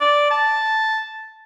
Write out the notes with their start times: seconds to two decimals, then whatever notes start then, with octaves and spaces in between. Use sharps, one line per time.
0.01 D5
0.31 A5